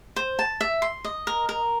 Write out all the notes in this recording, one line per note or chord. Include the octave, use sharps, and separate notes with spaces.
C5
A5
E5
C6
D#5
A#4
A#4